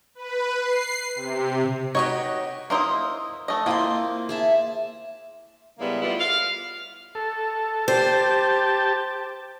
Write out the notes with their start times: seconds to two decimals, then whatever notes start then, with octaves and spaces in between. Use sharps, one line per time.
0.15 B4
0.59 C7
1.15 C3
1.95 D#4 F#4 G4 B4 C#5 D#5 C#6
2.70 A#3 D#4 E4 C5 C6 D#6
3.48 A3 D#5
3.66 A#3 C4 E4 F4 C6
4.29 G#4 E5 A5
5.79 C#3 G3 G#3 A#3 B3 E4
6.02 G3 A3 B3 E4 F4
6.19 F5
7.15 A4
7.88 G4 C5 A5